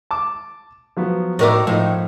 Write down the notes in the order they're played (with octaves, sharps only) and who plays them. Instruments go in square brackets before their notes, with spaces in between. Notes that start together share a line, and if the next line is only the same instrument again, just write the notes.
[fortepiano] A5 D6
F3 F#3 B3
[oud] A2 A#4 D5 [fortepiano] D#4 F#4 E5
[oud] A2 [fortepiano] F3 D#4